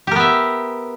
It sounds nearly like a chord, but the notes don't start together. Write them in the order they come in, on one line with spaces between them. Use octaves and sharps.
G4 A#4 B3 E5